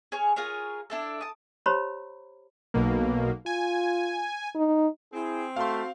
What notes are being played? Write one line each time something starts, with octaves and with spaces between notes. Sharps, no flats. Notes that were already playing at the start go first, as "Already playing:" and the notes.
G#4 C#5 G#5 F6
F4 G#4 A#4 C#5
D4 E4 A4
A5 D#6
G4 C5 C#5 A#5 B5
B1 B2 A#3
F4 G#5
D#4
C4 E4 G#4
A3 F#4 F5 C6